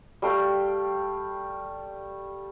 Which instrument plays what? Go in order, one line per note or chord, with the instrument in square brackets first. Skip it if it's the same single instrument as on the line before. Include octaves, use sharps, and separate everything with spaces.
[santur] G3 A3 F5 G5